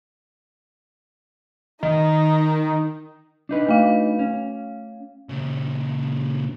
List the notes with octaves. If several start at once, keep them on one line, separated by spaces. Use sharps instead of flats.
D#3 D#4
D4 D#4 B4
A3 F5
C#4
A#2 C#3